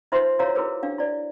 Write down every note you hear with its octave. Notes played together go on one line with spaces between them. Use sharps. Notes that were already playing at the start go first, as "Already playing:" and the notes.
D#4 F4 B4 C5 E5 C6
E4 F#4 A#4 C#5 F5 A#5
E4 F#4 G#4 A#4 B4
D4 F5
E4 D5